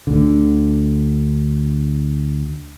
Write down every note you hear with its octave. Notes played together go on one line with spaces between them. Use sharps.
D2 D3